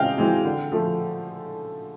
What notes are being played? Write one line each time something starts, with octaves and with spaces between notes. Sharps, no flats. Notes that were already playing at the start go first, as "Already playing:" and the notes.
Already playing: C#3 E3 G#3 C4 D#5 F5 G5
E3 G#3 C4
D3
F3 A3